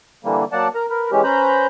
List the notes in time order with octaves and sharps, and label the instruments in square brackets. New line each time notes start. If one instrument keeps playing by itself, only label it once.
[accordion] D3 E3 G3 A#3
F#3 A#3 D5 F#5 A5
A#4 A#5
A#4 B4
E3 G#3 C#4 G4
C#4 B4 C5 A#5 B5 G6